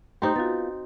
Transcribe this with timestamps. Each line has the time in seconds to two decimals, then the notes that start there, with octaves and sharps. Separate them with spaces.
0.22 A3 C4 D#4 G4 C5
0.36 B3 F4 F#4 A6